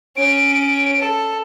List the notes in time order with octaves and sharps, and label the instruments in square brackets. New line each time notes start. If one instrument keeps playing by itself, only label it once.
[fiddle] C#4 C#5 [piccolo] D7
[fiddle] A4